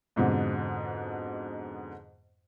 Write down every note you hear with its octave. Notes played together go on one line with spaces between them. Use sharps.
F2 G#2 B2 D3